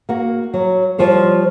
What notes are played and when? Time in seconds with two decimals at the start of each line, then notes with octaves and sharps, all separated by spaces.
0.09 A#3 F#4
0.54 F#3
0.98 F3 G3 C5 C#5